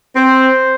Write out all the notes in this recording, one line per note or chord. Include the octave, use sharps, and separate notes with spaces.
C4 C5